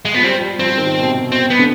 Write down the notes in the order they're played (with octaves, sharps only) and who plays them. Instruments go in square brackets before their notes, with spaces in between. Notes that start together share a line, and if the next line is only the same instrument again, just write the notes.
[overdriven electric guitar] G#3
[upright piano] F3 [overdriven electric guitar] B3
[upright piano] G3 [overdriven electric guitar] C4
[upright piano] F3
G3
[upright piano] F3 [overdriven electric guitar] C4
[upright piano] F3
D#3
B2
C3
[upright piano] B2 [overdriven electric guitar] C4
[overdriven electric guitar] B3
[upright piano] D3